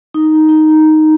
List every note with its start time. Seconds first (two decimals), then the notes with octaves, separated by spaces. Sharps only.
0.14 D#4
0.49 D#4